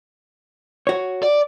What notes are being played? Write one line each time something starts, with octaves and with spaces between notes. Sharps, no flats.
F#4 C#5
D5